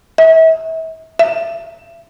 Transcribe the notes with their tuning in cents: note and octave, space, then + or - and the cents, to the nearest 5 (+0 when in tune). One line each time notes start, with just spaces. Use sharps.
E5 -35
E5 +20